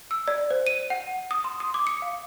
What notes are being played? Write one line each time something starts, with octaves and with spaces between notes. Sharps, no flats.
E6
D5
C5
D#7
F#5
D#6
C6
D#6
D6
C#7
F5